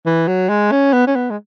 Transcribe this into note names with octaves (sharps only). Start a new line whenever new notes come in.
E3
F#3
G#3
C#4
B3
C#4
B3
G#3